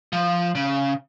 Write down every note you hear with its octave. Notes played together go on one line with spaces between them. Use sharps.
F3
C#3